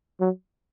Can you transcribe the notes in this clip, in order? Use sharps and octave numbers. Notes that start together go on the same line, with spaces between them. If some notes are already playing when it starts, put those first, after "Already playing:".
F#3